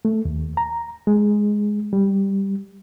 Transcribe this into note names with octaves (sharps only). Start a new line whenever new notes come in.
A3
D#2
A#5
G#3
G3